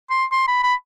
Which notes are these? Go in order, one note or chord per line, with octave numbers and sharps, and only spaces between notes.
C6
C6
B5
B5